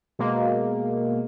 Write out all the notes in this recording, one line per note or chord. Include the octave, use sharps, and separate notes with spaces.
B2 G#3 A#3